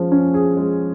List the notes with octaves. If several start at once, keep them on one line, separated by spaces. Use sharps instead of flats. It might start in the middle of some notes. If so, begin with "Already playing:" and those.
Already playing: F3 G#3 C#4
C#4
G#4
G#3